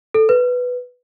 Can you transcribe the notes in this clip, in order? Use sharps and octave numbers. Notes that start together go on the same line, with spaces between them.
A4
B4